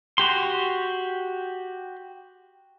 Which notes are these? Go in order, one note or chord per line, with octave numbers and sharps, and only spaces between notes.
F#4 G4 C6